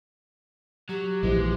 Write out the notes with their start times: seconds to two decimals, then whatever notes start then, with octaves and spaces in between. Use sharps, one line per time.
0.89 F#3 G4
1.23 A#1 E3 F3 G#3